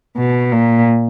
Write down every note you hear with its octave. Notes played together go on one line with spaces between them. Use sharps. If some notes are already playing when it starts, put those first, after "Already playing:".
B2
A#2